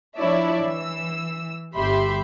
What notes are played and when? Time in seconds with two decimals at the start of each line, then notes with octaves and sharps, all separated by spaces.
0.17 F3 D4 E4 C#5 D5 E5
0.66 E3 E6
1.76 G1 G4 E5 B5 C6